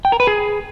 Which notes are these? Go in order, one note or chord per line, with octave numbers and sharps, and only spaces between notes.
G5
A#4
B4
G#4